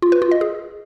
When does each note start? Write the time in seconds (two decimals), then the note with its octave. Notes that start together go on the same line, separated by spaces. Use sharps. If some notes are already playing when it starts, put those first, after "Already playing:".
0.02 F4
0.12 B4
0.22 F4
0.31 D#5
0.41 G#4